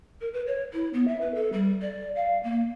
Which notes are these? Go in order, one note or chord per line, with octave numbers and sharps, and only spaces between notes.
A#4
B4
C#5
E4
B3
E5
B4
A4
G3
D5
F5
A#3